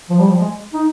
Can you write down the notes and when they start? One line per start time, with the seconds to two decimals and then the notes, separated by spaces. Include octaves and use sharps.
0.10 F3
0.19 G3
0.30 F3
0.41 G#3
0.73 D#4